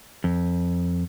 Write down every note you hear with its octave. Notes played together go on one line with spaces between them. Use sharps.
F2